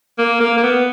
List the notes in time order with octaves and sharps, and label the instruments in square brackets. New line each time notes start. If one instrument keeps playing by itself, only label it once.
[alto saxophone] A#3
A#3
A#3
B3